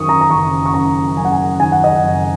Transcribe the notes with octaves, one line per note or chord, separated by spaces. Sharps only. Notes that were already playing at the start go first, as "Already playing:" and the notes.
Already playing: F#2 D#3 C#6 D#6
A#5
A#5
F#1 C#6
C#6
F#1 A#5
F#2 G#5
F#5
G#5
D#3 G#5
F#5
D#5
F#5
F#1